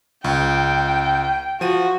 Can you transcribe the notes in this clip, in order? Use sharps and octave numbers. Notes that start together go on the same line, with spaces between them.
C#2 G5
F3 F#4 D#7